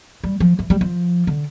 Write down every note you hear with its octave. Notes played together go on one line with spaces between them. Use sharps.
G3
F3
E3
G3
F3
D3